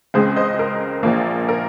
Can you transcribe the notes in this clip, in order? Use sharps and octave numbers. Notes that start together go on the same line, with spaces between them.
C#2 C#3 G#3 C4 G#4 C5
C5 D#5
A#4
A#1 A#2 F3 A#3
A#4